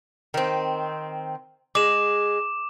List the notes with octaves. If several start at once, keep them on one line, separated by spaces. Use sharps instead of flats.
D#3 C4
G#3 D6 E7